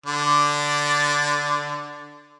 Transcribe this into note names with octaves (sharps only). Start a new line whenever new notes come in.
D3 D5